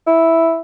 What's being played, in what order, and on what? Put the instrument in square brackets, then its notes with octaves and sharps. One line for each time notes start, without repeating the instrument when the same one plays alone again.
[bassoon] E4